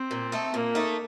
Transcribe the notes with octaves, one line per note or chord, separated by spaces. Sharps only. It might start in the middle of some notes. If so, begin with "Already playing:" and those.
Already playing: C4
A#2
A3 D#4
A#2 A#3
A3 D#4